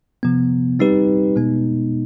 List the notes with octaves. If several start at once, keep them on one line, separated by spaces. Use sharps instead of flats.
C3 F3 B3
G3 C4 D#4 G4 B4
B2 G#3 B3 D#4